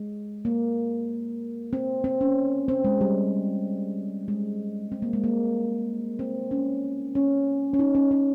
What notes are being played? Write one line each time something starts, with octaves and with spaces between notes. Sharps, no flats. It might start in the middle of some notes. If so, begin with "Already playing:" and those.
Already playing: G#3
A#3
C4
C4
C#4
C4
G#3
G3
G#3
C4
A#3
G#3
A#3
C4
C#4
C#4
C#4
D#4
C#4
C#4